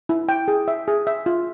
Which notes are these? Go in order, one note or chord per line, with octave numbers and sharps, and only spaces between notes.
E4
G5
G#4
E5
G#4
E5
F4